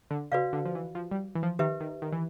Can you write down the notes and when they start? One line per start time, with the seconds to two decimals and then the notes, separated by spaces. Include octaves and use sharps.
0.11 D3
0.32 C#3 F#4 B4 D5 F5
0.53 D3
0.65 F3
0.75 E3
0.95 F3
1.11 G3
1.35 E3
1.43 F3
1.59 D#3 G4 B4 E5
1.81 D#3
2.02 D#3
2.12 E3